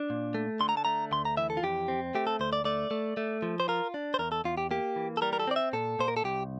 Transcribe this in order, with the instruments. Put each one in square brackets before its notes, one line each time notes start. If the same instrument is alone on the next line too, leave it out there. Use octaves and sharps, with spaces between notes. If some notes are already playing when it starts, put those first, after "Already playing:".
Already playing: [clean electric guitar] D4
A#2
A3
D3 C6
A#5
A5
A3 A#5
D2 C6
A#5
E3 E5
A4
F4
F2 G4
C4
A3 G4
A4
D2 C5
D5
A3 D5
A3
A3
F3
C5
F4 A#4
D4
C5
E2 A#4
A4
E2 F4
G4
A#3 G4
E3
A4
G3 A#4
A#4
A4
C4 D5
E5
A#2 A4
A#2 C5
A#4
A4
C2 G4